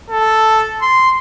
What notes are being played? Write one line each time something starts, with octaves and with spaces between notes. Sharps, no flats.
A4
C6